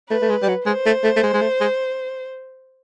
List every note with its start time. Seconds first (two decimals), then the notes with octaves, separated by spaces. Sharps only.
0.10 A3 B4
0.22 A3
0.29 G#3
0.42 G3
0.48 F#3
0.66 G#3 C5
0.86 A3
1.04 A3
1.16 A3
1.23 G#3
1.34 G#3
1.42 A3
1.60 G#3